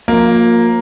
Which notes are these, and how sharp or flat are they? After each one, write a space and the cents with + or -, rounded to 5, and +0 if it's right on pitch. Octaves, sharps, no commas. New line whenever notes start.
F3 +40 A#3 +0